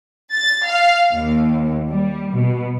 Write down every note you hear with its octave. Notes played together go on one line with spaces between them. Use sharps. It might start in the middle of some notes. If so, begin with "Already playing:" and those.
A6
F5
D#2
G3
B2